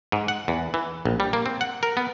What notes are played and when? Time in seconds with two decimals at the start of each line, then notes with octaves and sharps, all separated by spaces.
0.12 G#2
0.28 F#5
0.48 E2
0.74 E3
1.05 A#1
1.20 G3
1.33 A#3
1.46 C4
1.61 F#5
1.83 A#4
1.97 B3